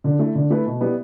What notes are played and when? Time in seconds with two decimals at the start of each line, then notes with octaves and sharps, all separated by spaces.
0.04 D3
0.19 A3 E4
0.35 D3
0.50 A3 E4 B4
0.66 B2
0.81 G3 B3 E4